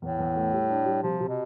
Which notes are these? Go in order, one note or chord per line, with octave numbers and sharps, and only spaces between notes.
E2 A2
E2
A3
G3
D4
G3
C3 F3
C3
B2